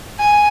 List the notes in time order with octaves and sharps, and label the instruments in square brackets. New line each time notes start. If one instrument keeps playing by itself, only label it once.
[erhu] G#5